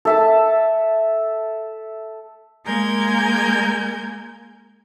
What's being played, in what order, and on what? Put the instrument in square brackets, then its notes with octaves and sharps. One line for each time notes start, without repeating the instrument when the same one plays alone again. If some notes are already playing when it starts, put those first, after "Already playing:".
[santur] A4 E5 A5
[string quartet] G#3 A#3 A#4 G#5 G6 G#6